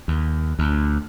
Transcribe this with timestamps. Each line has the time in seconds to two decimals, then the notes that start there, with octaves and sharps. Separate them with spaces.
0.08 D#2
0.59 D2